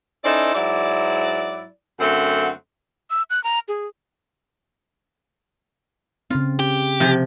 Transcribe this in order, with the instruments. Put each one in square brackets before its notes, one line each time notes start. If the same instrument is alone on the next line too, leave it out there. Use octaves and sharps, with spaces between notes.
[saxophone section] C#4 D#4 E4 A4 C5 D5
G#2 F#3 E4 D5
F#2 D3 A3 C4 F#5
[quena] E6
F#6
A#5
G#4
[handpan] C#3 C4 [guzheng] F4
[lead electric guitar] G4
[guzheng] C3 F3